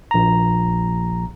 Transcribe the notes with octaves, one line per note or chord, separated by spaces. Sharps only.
A#1 A#5